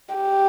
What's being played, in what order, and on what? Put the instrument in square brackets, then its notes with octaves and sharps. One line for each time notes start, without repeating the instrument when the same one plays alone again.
[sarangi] G4